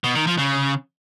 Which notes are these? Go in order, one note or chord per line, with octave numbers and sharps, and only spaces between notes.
B2
D#3
F3
C#3